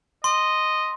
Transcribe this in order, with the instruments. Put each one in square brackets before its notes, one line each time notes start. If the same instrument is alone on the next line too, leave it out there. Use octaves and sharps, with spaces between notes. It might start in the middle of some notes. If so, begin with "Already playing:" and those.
[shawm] D#5 [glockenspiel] C6